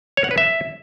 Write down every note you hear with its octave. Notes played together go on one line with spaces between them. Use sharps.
C#5
F#5
B4
E5